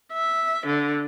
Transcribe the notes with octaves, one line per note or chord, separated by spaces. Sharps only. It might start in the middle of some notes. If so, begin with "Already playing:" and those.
E5
D3